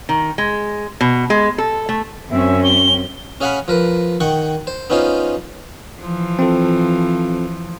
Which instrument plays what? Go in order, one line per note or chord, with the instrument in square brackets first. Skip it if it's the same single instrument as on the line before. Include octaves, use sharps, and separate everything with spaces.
[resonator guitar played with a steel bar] D#3
G#3
B2
G#3
A4
A3
[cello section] F#2 C4 C#4 [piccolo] E5
[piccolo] G7
[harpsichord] C#4 G#4 F5 F#5 G#5 B5
F3 A#4 B4
D#3 F#5 G5 C#6
C5
B3 C#4 D#4 F4 C5
[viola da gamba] E3 F3
[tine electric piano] C4 F4 A4